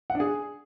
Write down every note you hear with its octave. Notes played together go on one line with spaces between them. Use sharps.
F#5
D4
G#4